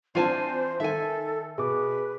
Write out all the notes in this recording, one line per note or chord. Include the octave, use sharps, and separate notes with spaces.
E3 C4 D4 F4 C5 G#5 A5
D#3 A4 E5 G#5
B2 G#4 B4 D6